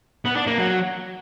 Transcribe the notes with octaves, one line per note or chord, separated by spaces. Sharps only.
B3
D4
A#3
F#3